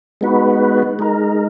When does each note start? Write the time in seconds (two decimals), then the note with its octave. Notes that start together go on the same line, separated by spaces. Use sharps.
0.21 G#3 B3 D#4 F#4 B4
0.99 G#3 D#4 A#4